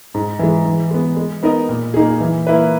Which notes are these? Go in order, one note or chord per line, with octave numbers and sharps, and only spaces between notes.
G#2
E3 G#3
E3
G#3 B3
G#3
B3 D#4 A#4 D#5
A#2
A#3 D#4 G#4
E3
A#3 E4 B4